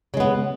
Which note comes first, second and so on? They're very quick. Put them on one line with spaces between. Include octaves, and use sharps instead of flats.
C#3 G#3 B3